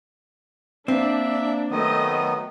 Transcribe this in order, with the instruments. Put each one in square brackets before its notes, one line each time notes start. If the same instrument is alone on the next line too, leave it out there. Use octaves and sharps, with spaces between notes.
[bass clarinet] A#3 [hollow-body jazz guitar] C4 [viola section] D4 [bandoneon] E5
[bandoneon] D#3 F#3 B3 [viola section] A3 D#5